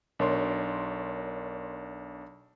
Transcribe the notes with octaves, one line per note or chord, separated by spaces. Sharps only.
B1 D4 A#4 C#5 C6